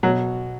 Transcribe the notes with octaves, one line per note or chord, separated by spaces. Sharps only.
B2 F#3